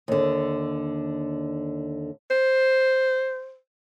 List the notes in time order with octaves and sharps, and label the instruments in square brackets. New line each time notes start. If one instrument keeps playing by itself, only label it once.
[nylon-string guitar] D#2 D3
[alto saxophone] C5